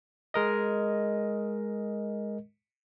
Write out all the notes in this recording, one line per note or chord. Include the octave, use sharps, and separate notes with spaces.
G#3 A#4 D#5